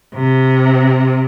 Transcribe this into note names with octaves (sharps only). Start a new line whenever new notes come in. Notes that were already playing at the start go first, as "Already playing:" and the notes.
C3